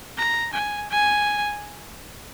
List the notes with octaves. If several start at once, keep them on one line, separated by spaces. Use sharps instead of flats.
A#5
G#5
G#5